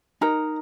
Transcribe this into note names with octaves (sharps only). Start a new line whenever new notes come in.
D#4 A#4 A#5